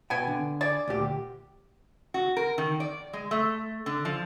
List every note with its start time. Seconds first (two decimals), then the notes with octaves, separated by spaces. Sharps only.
0.10 B2 B3 G5 G#5
0.27 D3
0.61 G#4 D5
0.88 D2 A#2 G4
2.14 F#4
2.37 A#4
2.58 D#3
2.80 D5
3.13 G#3
3.31 A3
3.86 D3
4.05 F3